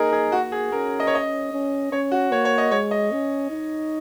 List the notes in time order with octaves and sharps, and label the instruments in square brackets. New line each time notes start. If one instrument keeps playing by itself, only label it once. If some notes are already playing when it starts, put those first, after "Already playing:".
Already playing: [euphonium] A#3 [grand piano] D#4 G#4 A#4
[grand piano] G#4
[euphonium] A#3 [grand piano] F#4
[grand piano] G#4
[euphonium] C#4 [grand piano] A#4
[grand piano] D#5
C#5
D#5
[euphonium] C#4
[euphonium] C#4 [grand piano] C#5
[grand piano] F#4
[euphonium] A#3 [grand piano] C#5
[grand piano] C#5
D#5
[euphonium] G#3 [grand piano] C#5
[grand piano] D#5
[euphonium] C#4
D#4